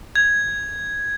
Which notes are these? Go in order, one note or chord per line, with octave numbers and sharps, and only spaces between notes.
G#6